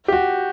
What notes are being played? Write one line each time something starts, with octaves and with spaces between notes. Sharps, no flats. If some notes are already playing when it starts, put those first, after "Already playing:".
G4
F#4